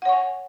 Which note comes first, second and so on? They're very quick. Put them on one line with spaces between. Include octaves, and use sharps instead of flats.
F#5 C#5 C#6 G#5